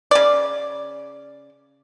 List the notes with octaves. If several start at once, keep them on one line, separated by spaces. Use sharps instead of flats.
C#3 D5